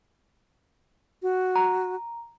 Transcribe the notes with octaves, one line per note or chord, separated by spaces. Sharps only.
F#4
A#5